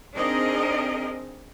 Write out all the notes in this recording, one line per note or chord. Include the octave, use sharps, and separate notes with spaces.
C4 D4 D#4 G#4 A#4 D#5